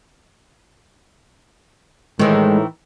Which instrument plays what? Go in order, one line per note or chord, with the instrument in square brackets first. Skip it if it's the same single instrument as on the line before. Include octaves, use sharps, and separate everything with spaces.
[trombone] A2 [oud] D#3 E3 [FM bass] G#3